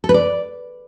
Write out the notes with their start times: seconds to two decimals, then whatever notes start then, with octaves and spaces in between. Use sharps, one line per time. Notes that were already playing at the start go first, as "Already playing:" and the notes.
0.04 A4
0.09 B4
0.14 D5